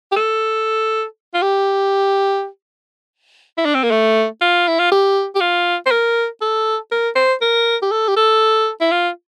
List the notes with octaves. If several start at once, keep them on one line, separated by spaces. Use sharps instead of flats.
G4
A4
F4
G4
E4
D4
C4
A#3
A3
F4
E4
F4
G4
G4
F4
C5
A#4
A4
A#4
C5
A#4
G4
A4
G4
A4
E4
F4